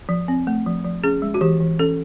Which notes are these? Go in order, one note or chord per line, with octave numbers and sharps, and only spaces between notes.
F3
C4
A3
F3
F3
C#4 G#4
G#3
F#4
E3 G4
E3
C#4 A4